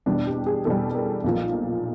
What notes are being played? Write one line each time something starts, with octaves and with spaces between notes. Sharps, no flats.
E2 B2 G3 D4
G4
G#4
E2 B2 G3 A4
A#4
B1 A#2 F3